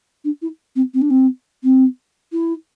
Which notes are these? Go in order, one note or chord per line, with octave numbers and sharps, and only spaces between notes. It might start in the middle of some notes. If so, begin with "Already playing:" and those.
D4
E4
C4
C4
D4
C4
C4
E4